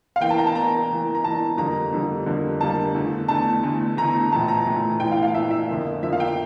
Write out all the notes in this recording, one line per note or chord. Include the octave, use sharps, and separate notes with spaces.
F5
E2 E3 A#3 G5
A5
A#5
A5
E2 E3 A#3 A#5
E2 E3 A#3
A#5
E2 E3 A#3 A5
F2 D3 G3 A#3 A#5
F2 D3 G3 A#3
F2 D3 G3 A#3
F2 D3 G3 A#3 A5
E2 D3 A3
E2 D3 A3 A5
E2 D3 A3
E2 D3 A3 A#5
A#1 A2 E3 A3 A5
A#5
A#1 A2 E3 A3
A#1 A2 E3 A3 G5
F5
F5
A#1 A2 E3 A3 E5
E5
F2 D3 F3 A#3
F2 D3 F3 A#3 E5
F5
G5